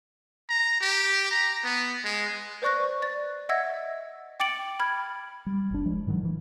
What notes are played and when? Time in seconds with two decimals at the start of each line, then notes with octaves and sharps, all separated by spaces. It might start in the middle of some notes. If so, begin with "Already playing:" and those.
0.49 A#5
0.81 G4
1.31 A#5
1.64 B3
2.05 G#3
2.62 B4 C5 D5 C#6 F#6 A#6
3.02 D5 A6
3.49 D#5 E5 F#5 E6 G#6 A#6
4.40 G5 D6 A6 C#7 D7 F#7
4.80 B5 F6 G#6
5.46 G3
5.71 F#1 C2 D4
5.86 F3 G#3
6.07 G#2 D#3 F3 F#3
6.25 E3